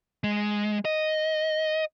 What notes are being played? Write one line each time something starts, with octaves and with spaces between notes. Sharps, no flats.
G#3
D#5